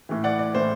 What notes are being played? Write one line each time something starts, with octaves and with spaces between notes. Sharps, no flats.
A2 E3
D5 F#5
D5
A2 E3 C5